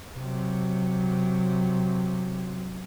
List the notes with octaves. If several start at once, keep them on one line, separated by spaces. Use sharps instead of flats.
C3 F#3